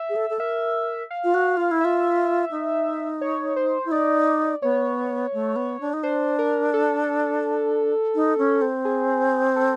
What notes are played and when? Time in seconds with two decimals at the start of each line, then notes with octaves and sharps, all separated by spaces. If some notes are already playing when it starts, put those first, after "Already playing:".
Already playing: E5
0.09 G#4
0.16 A4
0.30 A4
0.39 A#4 E5
1.11 F5
1.24 F4
1.34 F#4
1.57 F4
1.71 E4
1.81 F4 E5
2.51 D#4
3.21 C#5
3.56 C5
3.85 E4
3.91 D#4 D5
4.62 B3 C#5
5.34 A3
5.56 B3
5.81 D4
5.94 D#4
6.03 D4 C5
6.39 A#4
6.74 A4
8.15 D#4
8.38 C#4
8.62 C4
8.85 G#4
9.56 A4